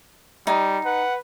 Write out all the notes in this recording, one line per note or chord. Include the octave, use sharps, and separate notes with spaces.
G3 D#4
B4 F#5